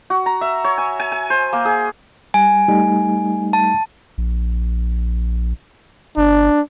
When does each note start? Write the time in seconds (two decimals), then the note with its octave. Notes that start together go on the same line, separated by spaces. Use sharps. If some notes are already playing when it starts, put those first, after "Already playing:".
0.10 F#4
0.26 A#5
0.41 E5
0.64 C#5
0.78 G#5
1.00 G#5
1.12 G#5
1.30 C5
1.53 A#3
1.65 G#4
2.34 G3 G#5
2.68 G3 A3 D#4
3.53 A5
4.18 A#1
6.17 G1 D4